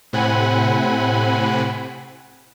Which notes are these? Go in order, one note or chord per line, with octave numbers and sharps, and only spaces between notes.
A2 C3 C4 F#5 G#5 B5